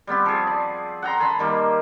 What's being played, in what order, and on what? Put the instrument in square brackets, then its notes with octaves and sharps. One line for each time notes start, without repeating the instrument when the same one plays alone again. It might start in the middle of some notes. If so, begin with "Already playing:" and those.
[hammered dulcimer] G3 B3 C4 G4
F3 G#4
D5
F#5 G5 A#5 C6
G#5 A5 B5 C6
D#3 G3 A#3